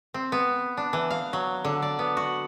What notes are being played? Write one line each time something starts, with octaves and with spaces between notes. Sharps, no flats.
C4
B3
D4
E3
F5
F#3
D3
D5
B3
F#4